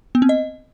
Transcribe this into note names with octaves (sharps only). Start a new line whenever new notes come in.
B3
C4
D#5